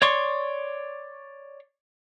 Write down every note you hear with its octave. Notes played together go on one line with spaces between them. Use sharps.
C#5 D5 C6 C#6